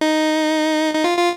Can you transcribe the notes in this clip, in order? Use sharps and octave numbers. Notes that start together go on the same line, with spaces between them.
D#4
D#4
F4
F4